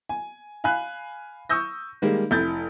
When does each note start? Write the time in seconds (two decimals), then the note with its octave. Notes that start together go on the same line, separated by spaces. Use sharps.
0.09 G#5
0.64 F5 G#5 B5 F#6
1.49 C#6 D#6 E6 G6 A#6
2.02 D#3 G3 G#3 A#3
2.31 F1 E4 G6 A6